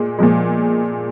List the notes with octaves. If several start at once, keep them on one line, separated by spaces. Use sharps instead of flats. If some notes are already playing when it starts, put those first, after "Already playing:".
Already playing: A#2 G#3
A#2 F3 G#3